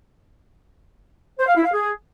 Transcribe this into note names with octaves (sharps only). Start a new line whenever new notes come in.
C5
F5
E4
F5
G#4